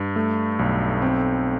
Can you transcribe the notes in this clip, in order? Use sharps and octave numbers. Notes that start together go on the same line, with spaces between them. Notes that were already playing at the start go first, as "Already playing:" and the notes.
Already playing: G2
A3
B1
C4